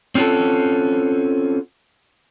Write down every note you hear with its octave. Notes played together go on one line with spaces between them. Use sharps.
C4 C#4 F4 F#4 A4